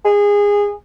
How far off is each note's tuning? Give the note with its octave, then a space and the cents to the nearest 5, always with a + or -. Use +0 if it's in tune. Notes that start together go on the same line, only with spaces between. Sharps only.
G#4 -20